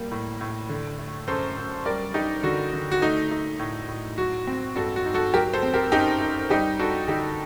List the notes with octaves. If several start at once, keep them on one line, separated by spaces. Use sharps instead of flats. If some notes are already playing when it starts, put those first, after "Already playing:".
Already playing: G3 A#3
A2
A2
D3
A3
F#2 A4 C5
F#2
G3 A#4 D5
D4 D#4 G4
D3 F#4
D3
F#4
A3 D#4
D#4
A2
A2
F#3 F#4
C4
G2 F#4 A4
F#4
D#4
F#4 A4
F#3 G4 A#4
A4 C5
C4
G4 A#4
F#2 D#4 G4
D#4
G3 D#4 G4
D4 F#4 A4
D3 D#4 G4